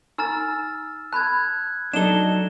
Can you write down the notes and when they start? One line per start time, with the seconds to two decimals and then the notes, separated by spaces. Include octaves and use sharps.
0.18 D#4 G#5 A#5 E6 F6 A6
1.13 A5 B5 F#6 G#6
1.94 F#3 D4 D#4 A4 E7 G7